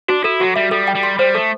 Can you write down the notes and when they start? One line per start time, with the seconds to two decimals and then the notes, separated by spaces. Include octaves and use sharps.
0.09 D4 F#4
0.24 E4 A4
0.40 F#3 F#4
0.56 G3 E5
0.71 G3 A4
0.87 G5
0.95 G3
1.03 C6
1.19 G3 C5
1.34 A3 A4